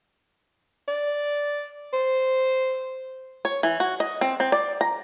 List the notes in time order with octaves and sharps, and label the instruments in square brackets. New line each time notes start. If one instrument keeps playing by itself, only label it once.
[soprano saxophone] D5
C5
[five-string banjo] C#5
E3
F#4
D#5
C4
C4
D5
A#5